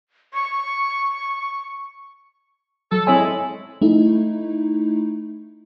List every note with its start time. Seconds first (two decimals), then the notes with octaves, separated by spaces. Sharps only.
0.34 C#6
2.92 F#3 A4
3.07 G#3 C4 E4 C#5 G#5
3.82 A3 D#4 E4